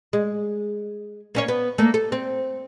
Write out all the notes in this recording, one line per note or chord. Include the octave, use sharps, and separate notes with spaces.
G#3
A#3 C#4 C#5
B3
A3 A#3
A4
C4